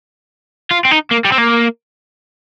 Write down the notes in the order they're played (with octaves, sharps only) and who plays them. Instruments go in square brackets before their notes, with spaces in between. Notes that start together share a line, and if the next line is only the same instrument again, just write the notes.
[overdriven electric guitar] F4
C4
D#4
A#3
G3
C4
A#3